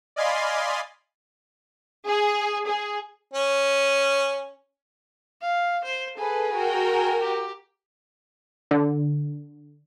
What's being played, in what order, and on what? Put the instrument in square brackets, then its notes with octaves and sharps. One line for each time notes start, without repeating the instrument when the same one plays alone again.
[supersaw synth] D5 D#5 F5 G#5 B5 C6
[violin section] G#4
G#4
[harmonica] C#4
[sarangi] F5
C5
[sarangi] G#4 [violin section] A4 B4
[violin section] F#4 A#4 G5
[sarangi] G#4
G4
[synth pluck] D3